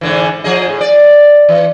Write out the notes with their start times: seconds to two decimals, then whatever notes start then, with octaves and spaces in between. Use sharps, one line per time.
0.01 G#2 D3 E3
0.44 F3 G#4 D#5
0.68 A2
0.81 D5
1.49 E3